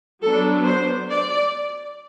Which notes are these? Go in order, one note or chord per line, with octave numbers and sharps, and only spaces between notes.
F#3 B3 D4 A4
C5
D5